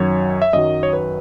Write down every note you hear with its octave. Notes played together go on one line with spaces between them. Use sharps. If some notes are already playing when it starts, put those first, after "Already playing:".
Already playing: F#2 D#3 F#3 C#5
E5
F#2 D#3 F#3 D#5
C#5
B4